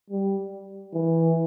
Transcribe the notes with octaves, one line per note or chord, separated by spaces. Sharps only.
G3
E3